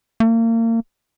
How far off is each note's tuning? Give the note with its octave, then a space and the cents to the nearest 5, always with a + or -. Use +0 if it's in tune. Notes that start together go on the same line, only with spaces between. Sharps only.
A#3 -35